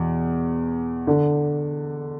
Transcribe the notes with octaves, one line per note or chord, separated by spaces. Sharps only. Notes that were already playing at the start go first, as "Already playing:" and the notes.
Already playing: E2 B2
D3